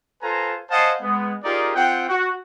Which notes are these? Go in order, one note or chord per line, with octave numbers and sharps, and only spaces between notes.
F4 A4 B4 C5 G#5 A#5
C5 D#5 F5 F#5 G#5 A5
G#3 B3
D#4 F4 G4 G#4 A#4 D5
C4 F4 F#5 G5
F#4